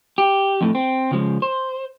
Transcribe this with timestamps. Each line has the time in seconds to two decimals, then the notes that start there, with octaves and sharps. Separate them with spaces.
0.18 G4
0.61 F2 A2 A3
0.75 C4
1.11 C#3 F3 G#3
1.42 C5